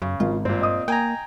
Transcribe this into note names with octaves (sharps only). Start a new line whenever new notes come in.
F#2 C#3
G#1 F4
G2 A#2 C4
D#5 D#6
A#3 G5 G#5 A#5